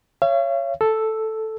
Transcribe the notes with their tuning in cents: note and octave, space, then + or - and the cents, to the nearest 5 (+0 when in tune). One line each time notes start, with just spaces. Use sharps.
C#5 +0 F5 -45
A4 +0 E6 +0